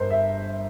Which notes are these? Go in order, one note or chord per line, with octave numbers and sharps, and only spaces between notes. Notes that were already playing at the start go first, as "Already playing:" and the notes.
Already playing: G1 G2 A#4 C5
E5